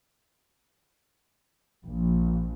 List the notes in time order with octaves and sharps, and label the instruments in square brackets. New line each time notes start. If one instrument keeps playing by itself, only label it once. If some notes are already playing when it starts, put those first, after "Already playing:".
[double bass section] A#1